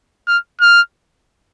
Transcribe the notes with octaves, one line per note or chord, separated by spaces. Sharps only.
F6
F6